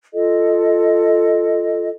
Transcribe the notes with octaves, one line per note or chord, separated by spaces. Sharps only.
F4 A4 D#5